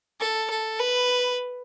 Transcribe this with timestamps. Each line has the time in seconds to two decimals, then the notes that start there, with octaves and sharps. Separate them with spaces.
0.20 A4
0.50 A4
0.79 B4